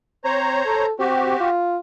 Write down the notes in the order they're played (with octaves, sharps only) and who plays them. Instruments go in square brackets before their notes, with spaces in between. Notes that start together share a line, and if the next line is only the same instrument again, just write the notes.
[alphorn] C4 [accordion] C5 C#5 A#5
[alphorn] A4
[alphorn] C4 [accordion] F#4 G4
[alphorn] F4